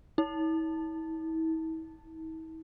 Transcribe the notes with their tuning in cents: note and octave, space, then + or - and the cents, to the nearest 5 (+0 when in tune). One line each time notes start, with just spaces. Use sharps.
E4 -45